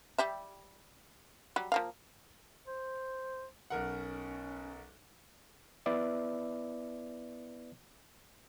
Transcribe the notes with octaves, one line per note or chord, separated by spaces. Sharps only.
G3 G4 E5
F#3 G3
F3 A#3 F5
C5
B1 C#4 A#4 F#5
B3 E4 B4 D5 E5